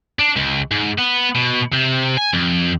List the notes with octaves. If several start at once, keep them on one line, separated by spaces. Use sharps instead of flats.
D4
C#2
G#2
B3
B2
C3
G#5
F2